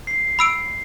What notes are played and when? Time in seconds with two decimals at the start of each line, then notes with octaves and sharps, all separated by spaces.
0.07 C7
0.39 B5 E6 D7